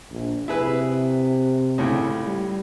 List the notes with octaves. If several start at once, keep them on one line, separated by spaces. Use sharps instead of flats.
A#1
C3 E4 G#4 B4
C#2 A2 C#3
G3